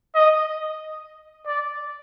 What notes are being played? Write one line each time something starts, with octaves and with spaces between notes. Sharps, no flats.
D#5
D5